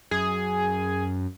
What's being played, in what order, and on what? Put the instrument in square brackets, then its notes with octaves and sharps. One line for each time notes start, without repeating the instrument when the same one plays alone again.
[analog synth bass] F#2 [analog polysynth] G#4